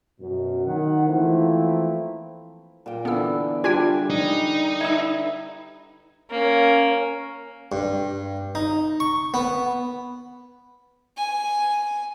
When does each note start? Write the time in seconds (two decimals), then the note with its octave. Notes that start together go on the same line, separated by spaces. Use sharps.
0.20 F#2 B2
0.66 D#3 F#5
1.06 E3 F3 A3 A#3 C4 E4
2.86 A#2 G5
3.05 D3 E3 B3 E6
3.64 G3 D4 F4 G4 G5 G#5
4.10 D#4
4.80 E4 B4 A#5 E6
6.30 A#3 C#4
7.72 G2
8.55 D#4
9.00 C#6
9.34 B3
11.18 G#5